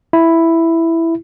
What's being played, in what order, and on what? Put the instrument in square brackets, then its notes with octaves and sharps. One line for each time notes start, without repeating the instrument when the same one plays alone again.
[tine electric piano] E4